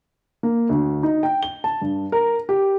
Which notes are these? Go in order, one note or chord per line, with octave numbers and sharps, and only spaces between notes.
A#3
D2
D#4
G5
G7
A5
G2
A#4
G4